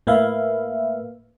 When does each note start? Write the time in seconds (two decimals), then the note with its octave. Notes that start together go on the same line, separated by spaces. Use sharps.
0.07 A2 A#3 B4 E5 F5